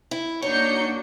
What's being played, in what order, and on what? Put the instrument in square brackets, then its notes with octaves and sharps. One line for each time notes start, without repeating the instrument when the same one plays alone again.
[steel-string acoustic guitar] E4
[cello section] A#3 D4 F#4 [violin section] D#4 G6 C#7 [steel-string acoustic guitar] C#5